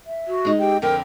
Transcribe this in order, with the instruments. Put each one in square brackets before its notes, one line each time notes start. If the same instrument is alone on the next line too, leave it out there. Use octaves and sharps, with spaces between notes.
[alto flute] E5
[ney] F#4
[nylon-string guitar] G#3 D#4
[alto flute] G4 [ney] G5
[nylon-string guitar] F2 D3 [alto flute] A#4 [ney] G5